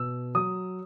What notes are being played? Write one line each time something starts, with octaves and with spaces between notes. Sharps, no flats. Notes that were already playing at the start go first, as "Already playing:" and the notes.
Already playing: B2 E6
F#3 D#6